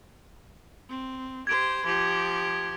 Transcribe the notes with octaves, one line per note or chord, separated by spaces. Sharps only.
C4
G4 C5 G#6 D7
F3 G4